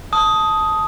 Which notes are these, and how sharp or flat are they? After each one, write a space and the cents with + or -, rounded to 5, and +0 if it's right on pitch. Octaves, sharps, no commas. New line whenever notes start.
A5 -5 D#6 +10